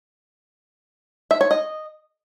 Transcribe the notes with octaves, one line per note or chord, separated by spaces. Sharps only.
E5
C#5
D#5